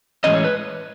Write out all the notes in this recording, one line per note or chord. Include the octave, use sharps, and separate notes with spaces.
A2 E3 G#3 C#4 D#5
C#5
B4